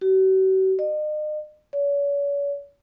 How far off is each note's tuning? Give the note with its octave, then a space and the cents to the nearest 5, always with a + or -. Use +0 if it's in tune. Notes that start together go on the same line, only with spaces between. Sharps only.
F#4 +45
D#5 -40
C#5 +40